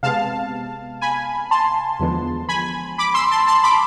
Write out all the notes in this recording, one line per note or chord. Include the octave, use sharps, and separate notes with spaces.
C3 G#3 B3 F5 A5
G#5 B5
A5 C6
E2 D3 F3 G#3 B3
G#5 B5
B5 D6
C6 E6
A5 C6
A5 C6
B5 D6